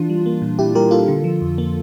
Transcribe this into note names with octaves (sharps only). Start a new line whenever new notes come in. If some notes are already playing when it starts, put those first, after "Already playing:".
Already playing: E3 D4 F4
G3
A#3
A#2
A#2 E4 G4
G3 G4 A#4
A#3 F4 A4
D3
F3
F2
A#3